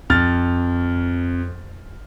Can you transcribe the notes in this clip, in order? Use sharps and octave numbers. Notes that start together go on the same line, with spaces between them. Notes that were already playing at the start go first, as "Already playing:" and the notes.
F2 F6 A6